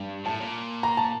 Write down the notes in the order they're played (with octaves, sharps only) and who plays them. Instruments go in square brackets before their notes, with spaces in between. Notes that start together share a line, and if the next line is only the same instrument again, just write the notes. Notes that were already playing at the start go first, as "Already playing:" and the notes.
Already playing: [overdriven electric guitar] G2
[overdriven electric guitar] A2 [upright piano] A5
[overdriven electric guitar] A#2
[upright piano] A#5
A5